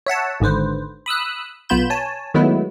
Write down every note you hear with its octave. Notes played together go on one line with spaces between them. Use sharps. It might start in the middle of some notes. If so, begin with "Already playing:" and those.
C#5 E5 F#5 A5
G#1 G#2 D3 B4 C5
B5 D#6 E6 F#6
B1 B3 F4 B5 G6 E7
C#5 G#5 A5
D#3 F#3 G#3 A3 B3 E4